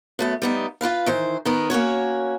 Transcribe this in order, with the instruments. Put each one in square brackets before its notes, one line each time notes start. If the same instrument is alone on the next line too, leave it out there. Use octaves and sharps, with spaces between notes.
[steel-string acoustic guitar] F#2 A3 B3
G3 B3 D#4
F4 G4 B4 F5
D#3 E3 C5
D#3 B3 A#4
A#3 C#4 F#4 C#5